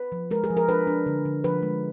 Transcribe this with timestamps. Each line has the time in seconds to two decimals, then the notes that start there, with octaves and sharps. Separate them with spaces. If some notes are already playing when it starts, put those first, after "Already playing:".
Already playing: B4
0.12 F3
0.31 G#3 A#4
0.44 G#4
0.50 F3
0.57 A#4
0.69 D4 B4
0.87 D4
1.06 D3
1.25 D3
1.44 F3 B4
1.63 G#3